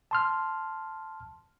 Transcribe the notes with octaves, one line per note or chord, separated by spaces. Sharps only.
A5 C6 F6